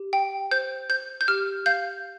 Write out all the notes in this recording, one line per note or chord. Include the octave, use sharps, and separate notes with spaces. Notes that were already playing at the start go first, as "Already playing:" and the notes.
Already playing: G4
G5
C5 G6
C5 G6
G6
G4 F6
F5 G6